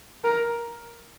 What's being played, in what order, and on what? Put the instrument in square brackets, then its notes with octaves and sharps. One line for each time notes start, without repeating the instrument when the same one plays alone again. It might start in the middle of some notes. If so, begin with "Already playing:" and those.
[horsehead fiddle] A#4